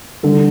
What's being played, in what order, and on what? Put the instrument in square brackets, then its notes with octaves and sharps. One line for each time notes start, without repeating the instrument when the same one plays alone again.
[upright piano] D3 G3 A4